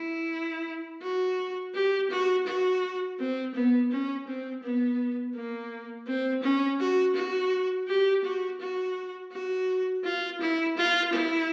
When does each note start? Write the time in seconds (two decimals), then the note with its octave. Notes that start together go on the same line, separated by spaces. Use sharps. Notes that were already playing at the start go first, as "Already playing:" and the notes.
Already playing: E4
1.02 F#4
1.74 G4
2.10 F#4
2.46 F#4
3.19 C4
3.55 B3
3.91 C#4
4.27 C4
4.63 B3
5.36 A#3
6.07 C4
6.43 C#4
6.80 F#4
7.15 F#4
7.88 G4
8.24 F#4
8.60 F#4
9.32 F#4
10.04 F4
10.41 E4
10.77 F4
11.13 E4